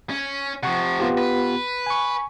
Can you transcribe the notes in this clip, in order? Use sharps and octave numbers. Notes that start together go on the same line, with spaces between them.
C#4
C3 F3 F#5 C#6
B3 F4 G4
B4
G#5 C#6